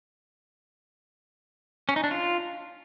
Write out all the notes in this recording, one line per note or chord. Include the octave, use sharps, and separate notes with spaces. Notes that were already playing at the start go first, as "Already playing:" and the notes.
C#4
D#4
D4
F4